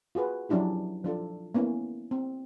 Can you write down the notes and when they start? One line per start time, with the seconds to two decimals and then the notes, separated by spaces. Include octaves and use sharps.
0.15 F4 F#4 G#4 B4
0.49 F3 F#3 C#4 D4 E4 G4
1.04 F3 D4 F4 A4
1.55 A#3 B3 C#4 E4
2.11 C4